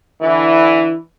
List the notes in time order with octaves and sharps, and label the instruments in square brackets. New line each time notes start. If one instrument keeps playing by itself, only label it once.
[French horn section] D3 E3